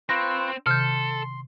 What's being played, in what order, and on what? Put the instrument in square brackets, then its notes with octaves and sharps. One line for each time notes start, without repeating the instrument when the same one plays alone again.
[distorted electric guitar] C4 [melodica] F4 B4 C#6 [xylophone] A#6
[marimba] C3 D#3 [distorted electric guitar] A4 [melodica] C6 [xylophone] F6 G6